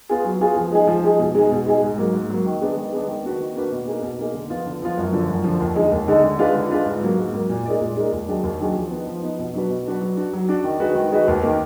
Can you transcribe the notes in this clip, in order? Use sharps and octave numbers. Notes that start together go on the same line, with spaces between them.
B3 F4 G#4
F#3
B3 F4 G#4
F3
G#3 D#4 G#4
F3
G#3 D#4 G#4
B2
G#3 D#4 G#4
B2
G#3 D#4 G#4
G#2
F#3 A#3
G#2
F#3 A#3
D#3
G#3 B3 D4
D#3
G#3 B3 D4
D#3
A#3 D4 F#4 B4
D#3
A#3 D4 F#4 B4
B2
A#3 D#4 G#4
B2
A#3 D#4 G#4
D3
F3 B3 F4
D3
F3 B3 F4
F#2
D3 F3
F#2
D3 F3
D#2
D3 G#3 D#4
D#2
D3 G#3 D#4
D3
G#3 D4 F4 B4
D3
G#3 D4 F4 B4
G#2
F#3 A#3
G#2
F#3 A#3
A#2
G#3 D#4 A#4 D5
A#2
G#3 D#4 A#4 D5
D#2
D#3 F#3 D4 G#4
D#2
D#3 F#3 D4 G#4
F3
B3 D#4
F3
B3 D#4
B2
F#3 D4 F#4 B4
B2
F#3 D4 F#4 B4
F#3
D4 F#4
F#3
D4 F#4
D#3
G#3 D#4 F#4 B4
D#3
G#3 D#4 F#4 B4
D#2
D#3 A#3